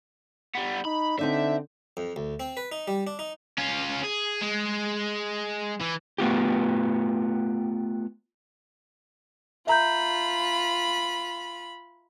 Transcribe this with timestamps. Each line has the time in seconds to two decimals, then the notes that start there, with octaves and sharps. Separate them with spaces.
0.55 G3 B3
0.85 D#4 B5
1.19 D3 C4 D#4 D5 E5
1.97 F2
2.16 D2
2.40 C4
2.57 B4
2.72 D#4
2.88 G3
3.07 D4
3.19 D#4
3.58 C#4 F4
4.04 G#4
4.42 G#3
5.81 E3
6.18 A3 B3 F4 G4
9.67 F4 E5 A#5 B5 G6